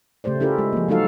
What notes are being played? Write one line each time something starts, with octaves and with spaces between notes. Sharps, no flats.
C#3 A3 G4 C5 D5
C#4 E4 F4 G4 A4 A#4
G#3
F3 A#3
F#3 G#3 D#4 F#4 A4 F5